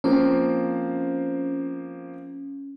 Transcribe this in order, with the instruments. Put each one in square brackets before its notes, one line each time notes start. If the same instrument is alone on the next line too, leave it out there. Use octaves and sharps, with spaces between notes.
[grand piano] F3 A#3 C4 [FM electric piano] C#4